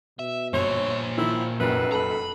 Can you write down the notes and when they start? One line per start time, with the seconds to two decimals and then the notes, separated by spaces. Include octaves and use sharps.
0.19 B2 E5
0.53 G1 A#2 C5 C#5 F7
1.18 D#3 F3 E4
1.60 F1 F#2 A#4 B4
1.92 A4 A#5 B5